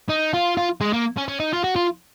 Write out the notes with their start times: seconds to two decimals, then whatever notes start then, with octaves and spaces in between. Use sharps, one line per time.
0.09 D#4
0.34 F4
0.57 F4
0.81 G#3
0.93 A#3
1.17 C#4
1.28 C#4
1.40 D#4
1.53 F4
1.64 F#4
1.76 F4